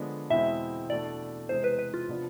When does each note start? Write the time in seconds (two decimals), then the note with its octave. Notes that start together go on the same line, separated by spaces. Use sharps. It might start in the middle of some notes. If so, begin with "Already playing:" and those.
Already playing: D3 F3 G#3 B3 D4
0.30 E2 B2 G#3 C4 E4 E5
0.89 E2 B2 A3 D4 D5
1.48 E2 C3 G#3 C5
1.64 B4
1.79 B4
1.94 F4
2.08 C3 F3 B3 D4